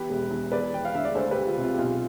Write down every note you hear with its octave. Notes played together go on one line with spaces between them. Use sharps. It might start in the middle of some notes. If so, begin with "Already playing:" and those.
Already playing: E3 B3 G4 B4
E1
E2
E2 B4 D5
E2 G5
F5
D3 E5
D5
D2 A4 C5
D2 G4 B4
F4
C3
F4
G4
B1 F4